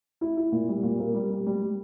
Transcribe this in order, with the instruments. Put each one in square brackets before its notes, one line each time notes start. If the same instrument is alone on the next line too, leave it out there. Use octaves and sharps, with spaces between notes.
[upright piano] E4
E4
A#2
G3
A#2
A#3
G3
G3
G3
G3